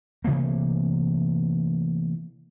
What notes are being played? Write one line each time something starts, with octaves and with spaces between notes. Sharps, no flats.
C3 E3 A3 A#3